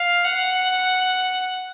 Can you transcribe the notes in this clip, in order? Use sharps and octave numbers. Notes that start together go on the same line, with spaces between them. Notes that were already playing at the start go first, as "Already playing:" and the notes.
Already playing: F5
F#5